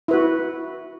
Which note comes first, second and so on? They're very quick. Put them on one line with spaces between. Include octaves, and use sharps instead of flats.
E4 B4 F#4